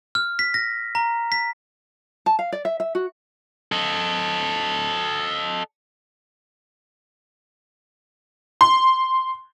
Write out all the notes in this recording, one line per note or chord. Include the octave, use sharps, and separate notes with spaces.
F6
B6
A#6
A#5
B6
A5
F5
D5
E5
E5
F#4
A4 D#5
C6